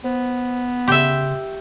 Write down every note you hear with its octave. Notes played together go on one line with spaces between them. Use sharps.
B3 C5
C#3 G4 E5 C6